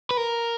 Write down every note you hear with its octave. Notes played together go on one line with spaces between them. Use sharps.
B4
A#4